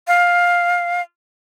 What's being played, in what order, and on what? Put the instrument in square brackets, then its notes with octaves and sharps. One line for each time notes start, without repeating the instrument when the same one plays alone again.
[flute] F5